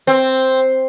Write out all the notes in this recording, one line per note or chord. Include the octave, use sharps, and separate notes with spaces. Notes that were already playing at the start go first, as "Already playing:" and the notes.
C4